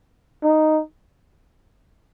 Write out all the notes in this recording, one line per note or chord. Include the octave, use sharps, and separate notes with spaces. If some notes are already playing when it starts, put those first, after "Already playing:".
D#4